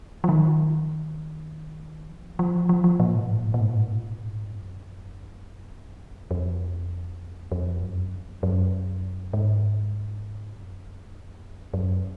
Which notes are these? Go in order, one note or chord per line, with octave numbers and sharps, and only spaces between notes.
F3
D#3
F3
F3
F3
F3
A#2
G#2
A#2
G#2
A#2
G#2
A#2
G#2
A#2
G#2
A#2
G#2
A#2
G#2
A#2
G#2
F#2
F2
F2
F#2
F#2
G#2
F#2
F#2